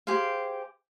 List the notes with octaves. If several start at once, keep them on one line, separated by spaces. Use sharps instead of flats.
G4 G#4 C5 F5